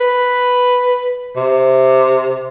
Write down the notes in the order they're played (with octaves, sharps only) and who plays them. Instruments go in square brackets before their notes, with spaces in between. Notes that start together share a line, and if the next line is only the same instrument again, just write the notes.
[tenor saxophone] B4
C3